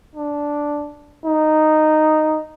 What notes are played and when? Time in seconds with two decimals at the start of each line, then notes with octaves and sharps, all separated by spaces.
0.15 D4
1.25 D#4